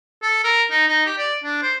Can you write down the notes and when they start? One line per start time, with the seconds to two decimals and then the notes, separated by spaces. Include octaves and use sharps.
0.23 A4
0.44 A#4
0.71 D#4
0.88 D#4
1.06 G4
1.18 D5
1.44 D4
1.62 C5